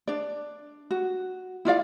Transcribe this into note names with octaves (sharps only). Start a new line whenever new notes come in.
D4 D5
F#4
E4 F4 D5 F5